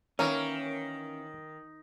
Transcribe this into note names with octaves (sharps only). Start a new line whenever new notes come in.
D#3 E3 A#3 C#4 A#4 C#5